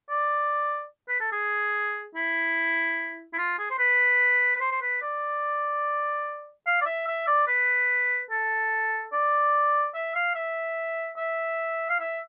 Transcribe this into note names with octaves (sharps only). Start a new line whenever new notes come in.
D5
B4
A4
G#4
E4
E4
F4
G#4
C5
B4
B4
C5
C5
B4
D5
F5
D5
E5
E5
D5
B4
A4
D5
E5
F5
E5
E5
F5
E5